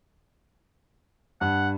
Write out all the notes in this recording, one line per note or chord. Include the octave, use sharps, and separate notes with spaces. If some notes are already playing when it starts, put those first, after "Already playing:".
G2 F#5